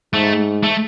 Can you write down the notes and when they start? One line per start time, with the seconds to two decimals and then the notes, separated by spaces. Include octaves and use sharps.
0.13 G#2 A3
0.63 A3